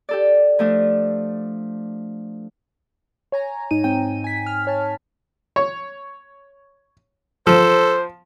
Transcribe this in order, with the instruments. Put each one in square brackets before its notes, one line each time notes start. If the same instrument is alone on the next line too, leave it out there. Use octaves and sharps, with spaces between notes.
[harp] G4 A4 D5
F3 A3 D4
[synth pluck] C#5 G#5 A#5
G#2 D#4 D#7
G#2 C4 G5 D#7
G#5 B6
F6
C#5 G#5 A5
[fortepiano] C#5
[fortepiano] F3 [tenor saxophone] A4 [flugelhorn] C5